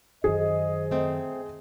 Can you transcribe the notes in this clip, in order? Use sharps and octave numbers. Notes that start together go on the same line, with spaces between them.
F#2 D#3 G#4 C5 D#5
A3 C4